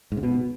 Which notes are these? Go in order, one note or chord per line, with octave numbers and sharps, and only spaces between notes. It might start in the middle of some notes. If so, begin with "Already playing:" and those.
G#2
C#3
B2